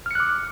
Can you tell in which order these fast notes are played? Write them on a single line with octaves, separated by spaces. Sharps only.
F6 C#7 F#6 D6